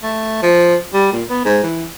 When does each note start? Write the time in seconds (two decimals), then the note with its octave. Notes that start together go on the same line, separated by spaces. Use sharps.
0.03 A3
0.43 F3
0.94 G3
1.13 A#2
1.30 B3
1.45 G#2
1.63 E3